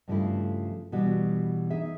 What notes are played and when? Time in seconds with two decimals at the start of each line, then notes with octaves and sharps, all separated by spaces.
0.08 G2 C#3 F3 G3 A3 E4
0.92 B2 E3 G3 F#4
1.70 D#4 G#4 E5